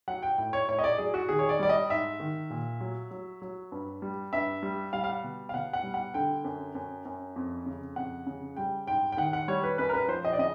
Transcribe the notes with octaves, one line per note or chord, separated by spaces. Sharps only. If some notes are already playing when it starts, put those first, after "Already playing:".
F#3 F#5
G5
A2 G5
C#5
A2 C#5
D#5
D5
F#3 G#4
F#4
D#3 G#4
C#5
D5
G3 D5
D#5
G#2 E5
D#3
A#2
F#3
F#3
F#3
G2
G3
G2 E5
G3
G3 F5
F5
F#5
B2
F5
B2 F#5
F#5
G3
F#5
D3 G5
F#2
F#2
F#2
F2
C#3
F2 F#5
C#3
G3 G5
G#2 G5
G5
D#3 F#5
F#5
G3 C#5
B4
F#2 B4
A#4
B4
F3 C5
D#5
D5
C#3 D#5